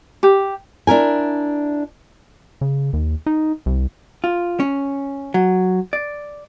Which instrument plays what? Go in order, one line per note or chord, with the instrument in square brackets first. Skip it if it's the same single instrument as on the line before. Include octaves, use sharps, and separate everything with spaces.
[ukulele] G4
[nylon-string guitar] D4 E4 A#4 G#5
[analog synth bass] C#3
D#2
D#4
C2
[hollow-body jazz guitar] F4
C#4
F#3
D5